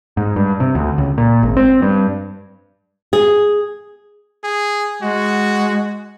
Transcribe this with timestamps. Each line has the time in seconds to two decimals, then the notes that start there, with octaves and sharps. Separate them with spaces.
0.17 G#2
0.36 G2
0.60 C3
0.75 D2
0.98 C#2
1.18 A#2
1.43 G#1
1.57 C4
1.82 G2
3.13 G#4
4.44 G#4
5.02 G#3 F#4